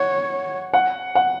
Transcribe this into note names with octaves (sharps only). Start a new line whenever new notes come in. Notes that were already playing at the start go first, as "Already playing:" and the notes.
Already playing: C#5 F#5
F#5
F#5